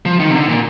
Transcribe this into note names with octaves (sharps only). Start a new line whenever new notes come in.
F3
D#3
C3
D3
A#2